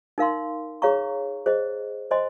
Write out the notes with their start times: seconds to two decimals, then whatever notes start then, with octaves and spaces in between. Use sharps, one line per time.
0.18 D#4 A#4 F5 C6
0.82 G#4 C#5 F5 A#5 C#6
1.46 G#4 C5 D#5
2.11 C5 D#5 G#5 C6